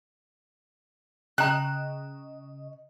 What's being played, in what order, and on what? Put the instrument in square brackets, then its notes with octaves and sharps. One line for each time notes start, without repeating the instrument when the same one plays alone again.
[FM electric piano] C#3 D#5 [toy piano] G5 A#5 [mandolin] F#6